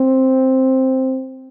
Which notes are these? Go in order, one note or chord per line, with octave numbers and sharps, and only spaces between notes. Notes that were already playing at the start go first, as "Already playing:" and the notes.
Already playing: C4